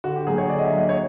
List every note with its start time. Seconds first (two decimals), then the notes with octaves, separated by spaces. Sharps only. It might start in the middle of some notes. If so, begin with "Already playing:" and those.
0.04 D3 F#4
0.16 G4
0.27 F#3 A#3 G#4
0.38 C#5
0.49 D3 D5
0.58 D#5
0.64 E5
0.72 F#3 A#3
0.79 D#5
0.89 C#5